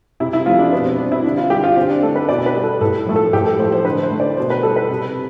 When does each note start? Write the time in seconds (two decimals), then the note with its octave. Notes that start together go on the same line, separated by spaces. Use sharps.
0.20 C3 E4
0.33 E4
0.46 F3 A3 F4
0.59 D4
0.72 B2 B3
0.85 C4
0.98 G3 D4
1.12 E4
1.24 D3 D4
1.37 F4
1.50 G3 G4
1.63 F4
1.76 D3 C4
1.90 D4
2.03 A3 A4
2.16 B4
2.29 B2 D5
2.46 B4
2.55 G3
2.63 A4
2.81 A2 A4
3.06 F3 A3
3.16 A4
3.33 A2 G4
3.46 A4
3.59 F3 A3 C5
3.72 C5
3.85 D3 B4
4.03 C5
4.11 A3
4.20 D5
4.37 B2 C5
4.50 B4
4.63 G3 A4
4.76 B4
4.89 C3